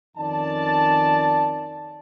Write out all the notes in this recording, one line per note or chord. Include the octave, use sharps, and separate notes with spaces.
F2 D#3 C#4 D5 A5